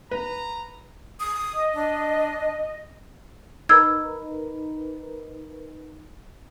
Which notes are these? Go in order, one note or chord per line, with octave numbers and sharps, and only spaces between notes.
B4 A#5
D#6
D#5
D4
D#4 A#4 B4 E6 G#6